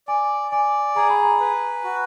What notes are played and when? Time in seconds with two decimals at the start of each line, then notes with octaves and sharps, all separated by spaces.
0.07 D5 G#5
0.51 D5 G#5
0.96 G#4 A#5
1.10 B5
1.23 A#5
1.40 B4
1.84 F#4